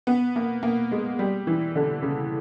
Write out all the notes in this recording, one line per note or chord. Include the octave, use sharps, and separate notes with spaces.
B3
A#3
A#3
G#3
G3
E3
D3
C#3